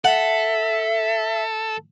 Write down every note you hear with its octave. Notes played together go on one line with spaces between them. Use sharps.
A4 E5 F#5